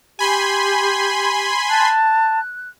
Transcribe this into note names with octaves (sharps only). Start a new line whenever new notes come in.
G4 G#5 B5 C6
A5 F#6